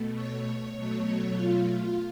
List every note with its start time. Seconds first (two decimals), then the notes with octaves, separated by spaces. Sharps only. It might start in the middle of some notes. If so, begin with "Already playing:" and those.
Already playing: B2 A3
0.13 C#5
0.75 B2 F#3 A3 C#5
1.37 F4